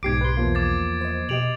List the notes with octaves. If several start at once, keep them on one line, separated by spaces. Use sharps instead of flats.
B1 G#2 B2 G4 D6 G#6 C7 D7
B4 C6
E2 F3 A#3
D6 G#6 A6
C5 D#5
B2 G4 D#5 D7 F7 F#7